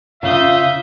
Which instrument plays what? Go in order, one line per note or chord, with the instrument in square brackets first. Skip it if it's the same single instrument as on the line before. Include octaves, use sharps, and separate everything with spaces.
[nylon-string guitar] C#3 [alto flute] F4 [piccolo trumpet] E5 [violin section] F5 D#6 G6